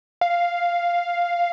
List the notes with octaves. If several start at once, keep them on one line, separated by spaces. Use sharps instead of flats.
F5